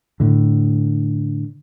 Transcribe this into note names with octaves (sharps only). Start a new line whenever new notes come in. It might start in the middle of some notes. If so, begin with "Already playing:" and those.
A2 D3